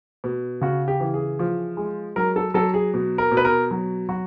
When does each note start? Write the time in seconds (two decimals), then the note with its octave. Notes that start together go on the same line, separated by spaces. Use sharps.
0.24 B2
0.61 C#3 F#4
0.88 G4
1.00 E3
1.14 G#4
1.39 F3
1.77 G#3
2.16 F#3 A#4
2.36 A4
2.54 F#3 A4
2.74 G#4
2.94 B2
3.18 A#4
3.32 B2
3.37 B4
3.45 A#4
3.71 F#3
4.09 F#3 F#4